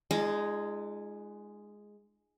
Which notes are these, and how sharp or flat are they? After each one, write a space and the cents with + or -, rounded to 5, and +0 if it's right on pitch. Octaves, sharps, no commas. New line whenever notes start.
G#3 +0 D4 +45 F4 -40